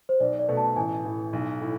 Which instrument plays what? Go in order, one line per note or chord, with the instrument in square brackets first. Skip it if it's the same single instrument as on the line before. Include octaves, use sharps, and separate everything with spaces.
[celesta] C5
[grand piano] B1 [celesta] D5
[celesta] D5
[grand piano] B2 A3
[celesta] A5
[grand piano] A1 [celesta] G#5
[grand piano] A2 E3
B1
A2